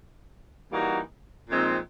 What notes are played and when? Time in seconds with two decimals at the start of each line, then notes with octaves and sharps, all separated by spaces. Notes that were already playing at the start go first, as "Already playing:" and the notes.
0.71 E3 G3 A#3 D#4 F#4
1.50 A#2 F3 G#3 C4 D#4